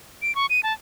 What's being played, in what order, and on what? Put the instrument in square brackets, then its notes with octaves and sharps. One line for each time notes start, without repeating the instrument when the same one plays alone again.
[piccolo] D7
C#6
D#7
A5